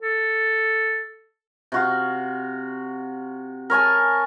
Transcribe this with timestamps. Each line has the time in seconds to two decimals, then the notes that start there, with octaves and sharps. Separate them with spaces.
0.02 A4
1.72 C3 F#4 F5
3.70 A#4 C#5 G#5 A5